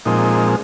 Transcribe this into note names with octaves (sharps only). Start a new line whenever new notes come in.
A#2 F3 G#3 C4 D#4